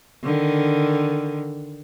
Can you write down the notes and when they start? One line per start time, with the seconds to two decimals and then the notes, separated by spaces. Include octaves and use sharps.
0.23 D3 D#3